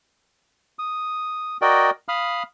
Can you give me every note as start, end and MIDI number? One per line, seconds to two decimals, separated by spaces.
0.79 1.57 87
1.62 1.90 66
1.62 1.90 70
1.62 1.90 74
1.62 1.90 75
1.62 1.90 79
2.08 2.43 77
2.08 2.43 83
2.08 2.43 87
2.08 2.43 89